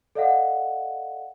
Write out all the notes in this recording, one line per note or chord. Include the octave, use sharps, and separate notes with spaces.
A4 D5 D#5 F5 F#5